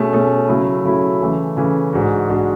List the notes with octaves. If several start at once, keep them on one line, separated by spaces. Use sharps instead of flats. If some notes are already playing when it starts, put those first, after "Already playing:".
Already playing: B2 A3 C#4 G#4
B2 A3 C#4 G#4
C#3 F#3 A3 E4
C#3 F#3 A3 E4
C#3 E3 A3
C#3 E3 A3
G#2 G#3 D4 F#4
G#2 G#3 D4 F#4